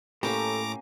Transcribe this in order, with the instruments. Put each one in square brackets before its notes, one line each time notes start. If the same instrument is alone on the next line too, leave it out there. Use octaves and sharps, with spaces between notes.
[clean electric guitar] A2 [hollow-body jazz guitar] A#3 C#4 G4 [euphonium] A4 [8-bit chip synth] A#5 D6